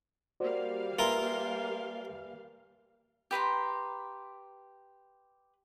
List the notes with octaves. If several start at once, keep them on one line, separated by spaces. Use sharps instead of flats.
G3 A#3 F#4 C5 D5 F5
F4 A#4 B4 E5 G#5
G4 B4 A#5 C6